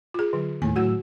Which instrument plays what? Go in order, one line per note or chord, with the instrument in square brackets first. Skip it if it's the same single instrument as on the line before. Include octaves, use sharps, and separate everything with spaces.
[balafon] F4 G#4
D3 F#3
[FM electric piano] D#2 A2 [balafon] D#3 G#5
[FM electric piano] A2 F#3 E6 [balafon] F#4 F#5